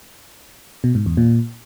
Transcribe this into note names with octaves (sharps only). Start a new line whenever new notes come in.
B2
G#2
E2
A#2